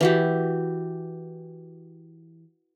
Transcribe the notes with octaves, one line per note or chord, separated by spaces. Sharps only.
E3 F#4 G4